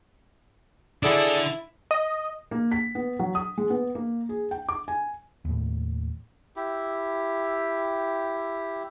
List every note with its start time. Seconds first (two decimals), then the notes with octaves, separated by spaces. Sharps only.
1.03 D4 E4 G#4 A4 D5 F#5
1.91 D#5
2.51 A#3
2.72 B6
2.95 B3
3.19 F#3
3.35 D#6
3.58 G#3
3.70 B3
3.95 A#3
4.29 G#4
4.51 G5
4.69 D6
4.88 G#5
5.45 D#2 A2
6.56 E4 G4